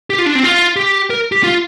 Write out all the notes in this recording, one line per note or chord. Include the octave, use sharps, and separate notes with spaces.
G4
F4
D4
C4
F4
G4
A#4
G4
F4